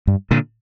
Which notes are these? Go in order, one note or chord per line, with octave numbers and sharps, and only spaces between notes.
G2
A#2 D3